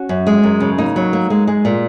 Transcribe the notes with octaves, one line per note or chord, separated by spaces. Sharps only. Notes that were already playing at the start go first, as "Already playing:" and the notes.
Already playing: C#4 F#4
F#2
G#3
F#2
C#3
A#3 D#4
F#3
A#3
G#3
G#3
A#2